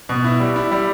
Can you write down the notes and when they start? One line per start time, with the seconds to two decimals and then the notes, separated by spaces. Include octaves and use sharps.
0.09 B2
0.24 E4
0.40 G3
0.56 E4
0.72 G3